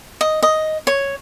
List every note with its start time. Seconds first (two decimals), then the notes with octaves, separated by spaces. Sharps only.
0.21 D#5
0.43 D#5
0.87 C#5